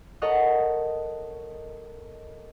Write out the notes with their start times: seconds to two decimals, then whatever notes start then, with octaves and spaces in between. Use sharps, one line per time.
0.22 A4 A#4 C#5 D#5 F#5